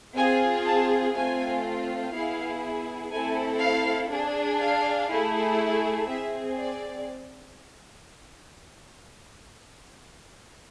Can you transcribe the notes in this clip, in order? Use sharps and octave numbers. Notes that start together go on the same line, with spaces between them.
C4 F4 G#4 G#5
A5
A3 C4 F4 G#5
B3 E4 G#4 F5
A3 C4 E4 A4 G#5
F5
D4 G#4
F5
A3 E4 G#4
C4 G#4 E5
D5